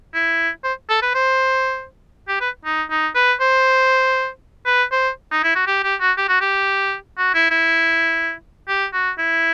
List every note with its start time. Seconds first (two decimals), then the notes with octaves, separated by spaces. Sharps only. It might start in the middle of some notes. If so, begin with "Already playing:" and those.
0.14 E4
0.64 C5
0.89 A4
1.02 B4
1.15 C5
2.28 G4
2.41 B4
2.65 D#4
2.90 D#4
3.15 B4
3.40 C5
4.66 B4
4.92 C5
5.32 D#4
5.43 E4
5.55 F#4
5.67 G4
5.84 G4
6.00 F#4
6.17 G4
6.29 F#4
6.41 G4
7.18 F#4
7.34 E4
7.51 E4
8.69 G4
8.93 F#4
9.18 E4